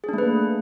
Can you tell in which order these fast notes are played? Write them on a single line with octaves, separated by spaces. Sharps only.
G#4 D4 A3 B4 A#3